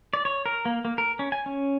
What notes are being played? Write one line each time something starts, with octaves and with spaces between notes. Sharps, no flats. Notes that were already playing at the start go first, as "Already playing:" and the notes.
D5
C#5
A#4
A#3
A#3
A#4
C#4
G#5
C#4